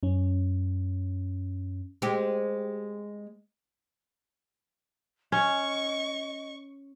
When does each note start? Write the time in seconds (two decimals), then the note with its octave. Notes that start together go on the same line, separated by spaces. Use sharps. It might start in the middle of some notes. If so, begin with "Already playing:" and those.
0.03 F#2 C#4
2.02 G#3 C4 G4
5.32 C#4 D#5 C#6